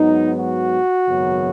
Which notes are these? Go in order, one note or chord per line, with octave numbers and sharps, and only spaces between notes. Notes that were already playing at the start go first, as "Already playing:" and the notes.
Already playing: G#2 F#3 B3 D#4
F#4
G#1 F#2 C#3 F#3 B3